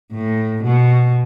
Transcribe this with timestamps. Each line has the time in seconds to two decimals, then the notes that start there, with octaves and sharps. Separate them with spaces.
0.13 A2
0.64 B2